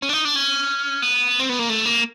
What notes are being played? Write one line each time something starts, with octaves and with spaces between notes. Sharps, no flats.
C#4
D4
D#4
D4
C#4
B3
C4
B3
A#3
A3
A#3